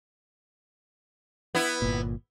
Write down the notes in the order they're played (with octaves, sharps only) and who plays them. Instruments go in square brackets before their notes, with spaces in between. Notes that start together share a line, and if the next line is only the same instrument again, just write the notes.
[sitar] B3 E4
[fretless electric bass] G1 A#2